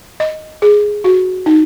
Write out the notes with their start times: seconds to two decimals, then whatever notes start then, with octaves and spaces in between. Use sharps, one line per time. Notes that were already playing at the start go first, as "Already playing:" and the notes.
0.20 D#5
0.62 G#4
1.04 F#4
1.46 D#4